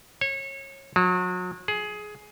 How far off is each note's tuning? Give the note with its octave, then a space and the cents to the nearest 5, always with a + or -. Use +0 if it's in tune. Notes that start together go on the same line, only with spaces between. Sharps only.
C#5 -25
F#3 -35
G#4 +15